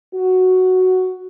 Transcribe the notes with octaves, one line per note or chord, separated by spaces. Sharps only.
F#4